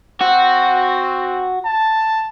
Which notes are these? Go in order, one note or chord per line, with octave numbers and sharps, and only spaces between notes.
C4 F#4
A5